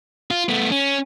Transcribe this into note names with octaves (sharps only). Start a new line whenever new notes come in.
F4
A3 B3
C#4